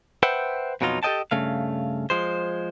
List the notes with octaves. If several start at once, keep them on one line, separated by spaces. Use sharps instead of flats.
B4 C5 E5 F#5 G5
F2 B2 F#3 D#4 F4
G4 A4 D5 D#5 G5 A5
G2 C#3 A3 F5
F3 G#3 C5